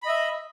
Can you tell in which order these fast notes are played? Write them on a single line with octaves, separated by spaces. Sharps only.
B5 D#5 E5